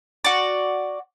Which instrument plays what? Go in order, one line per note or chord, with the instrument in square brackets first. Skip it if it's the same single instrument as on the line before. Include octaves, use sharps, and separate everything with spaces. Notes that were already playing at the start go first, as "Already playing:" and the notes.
[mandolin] F#4 D5